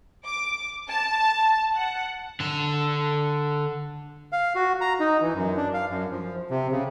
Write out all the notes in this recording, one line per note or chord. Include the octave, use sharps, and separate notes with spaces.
D6
A5
F#5
D3 A5
F5
F#4
A#5
D#4
E3
F#2
D4
F5
F#2
F3
C3
C#3